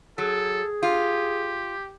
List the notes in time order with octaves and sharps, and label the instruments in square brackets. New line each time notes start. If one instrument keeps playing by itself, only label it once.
[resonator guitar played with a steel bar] F#3 [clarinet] G#4 [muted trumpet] A4
[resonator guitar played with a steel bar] F4 [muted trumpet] G4